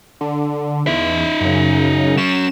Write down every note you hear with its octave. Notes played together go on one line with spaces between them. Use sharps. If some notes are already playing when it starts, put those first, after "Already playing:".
D3
E2 D#4 E5
F#2 C#3
F#3 C#4 E7